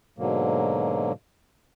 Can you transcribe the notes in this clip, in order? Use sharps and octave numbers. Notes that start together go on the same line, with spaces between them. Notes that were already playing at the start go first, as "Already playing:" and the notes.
G#2 B2 D3 F#3 A#3